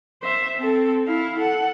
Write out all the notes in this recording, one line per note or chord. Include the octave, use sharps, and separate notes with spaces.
C5 E5
C4 A4
E4 F5
A4 F#5